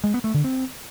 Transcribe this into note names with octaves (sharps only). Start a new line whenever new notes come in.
G#3
B3
A3
D3
C4